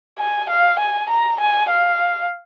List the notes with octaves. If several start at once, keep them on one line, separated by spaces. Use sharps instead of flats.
G#5
F5
G#5
A#5
G#5
F5